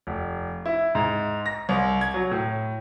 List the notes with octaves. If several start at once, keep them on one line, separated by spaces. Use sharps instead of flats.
F1
E4
G#2
A#6
C2
G#6
F#3
A2